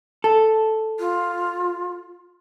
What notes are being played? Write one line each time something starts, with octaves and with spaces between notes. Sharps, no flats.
A4
F4